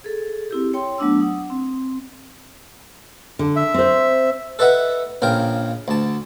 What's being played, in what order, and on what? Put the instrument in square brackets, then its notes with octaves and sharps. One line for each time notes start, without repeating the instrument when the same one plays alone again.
[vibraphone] G#4 A4
C4 E4 G4
C#5 G5 C6
F#3 A3 B3 D4 D6 E6
F#5 D#6
C4
[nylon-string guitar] D3
[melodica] E5
[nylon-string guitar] C4 C5
[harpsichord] A4 B4 D#5 E5 F#5
A#1 C#3 A#4 G5
D2 A5